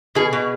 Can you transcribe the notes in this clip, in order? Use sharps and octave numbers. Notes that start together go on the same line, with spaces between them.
B2 G#4
B2